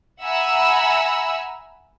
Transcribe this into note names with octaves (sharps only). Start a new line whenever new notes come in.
E5 F#5 G#5 A#5 B5 E6